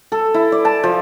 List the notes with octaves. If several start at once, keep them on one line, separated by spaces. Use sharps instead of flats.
A4
E4
D5
A5
F3